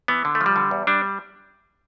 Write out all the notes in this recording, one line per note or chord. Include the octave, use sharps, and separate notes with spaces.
E3 B3
D3
A3
F3
G3
D3
E2
G3 D4